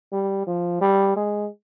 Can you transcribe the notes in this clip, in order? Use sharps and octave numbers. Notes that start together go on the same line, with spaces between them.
G3
F3
G3
G#3